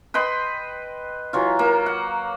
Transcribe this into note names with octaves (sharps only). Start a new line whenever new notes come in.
B4 D#5 G5 C6
E3 F#3 F4
A#3
F#5